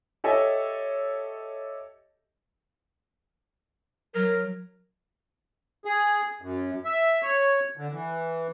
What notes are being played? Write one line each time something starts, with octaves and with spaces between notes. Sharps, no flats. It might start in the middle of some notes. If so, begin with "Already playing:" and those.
G4 A4 C#5 D#5 E5
F#3 A#4
G#4
F#2
E5
C#5
D3
E3